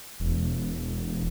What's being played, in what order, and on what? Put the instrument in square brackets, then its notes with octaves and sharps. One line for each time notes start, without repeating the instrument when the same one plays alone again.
[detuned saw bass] E1